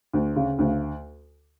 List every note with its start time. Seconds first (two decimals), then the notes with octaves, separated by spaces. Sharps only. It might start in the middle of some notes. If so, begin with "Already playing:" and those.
0.13 D2
0.36 C#3
0.59 D2